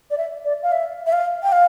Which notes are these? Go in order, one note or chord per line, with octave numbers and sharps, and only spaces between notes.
D5
E5
D5
F5
E5
E5
F5
G5
F5